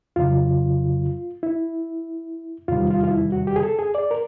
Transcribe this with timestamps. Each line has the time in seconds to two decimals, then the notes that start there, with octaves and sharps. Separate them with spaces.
0.16 F2 C#3 F#3 F4
1.43 E4
2.68 E2 C3 D#3 G3 F4
2.90 F4
3.03 F4
3.11 E4
3.32 F#4
3.47 G4
3.56 G#4
3.63 A4
3.79 G#4
3.95 D5
4.11 A#4